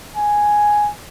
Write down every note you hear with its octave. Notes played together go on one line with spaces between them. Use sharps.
G#5